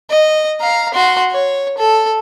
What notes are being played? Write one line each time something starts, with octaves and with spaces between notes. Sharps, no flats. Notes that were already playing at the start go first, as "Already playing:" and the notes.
D#5
F5 A#5
F#4 C6
C#5
A4